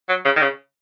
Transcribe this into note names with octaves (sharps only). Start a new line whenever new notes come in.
F#3
C#3
D#3
C#3